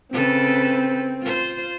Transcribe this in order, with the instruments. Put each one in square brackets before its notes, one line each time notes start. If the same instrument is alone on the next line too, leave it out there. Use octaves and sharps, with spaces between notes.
[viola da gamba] C#3 A4 B4 [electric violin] C4
[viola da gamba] F4 C5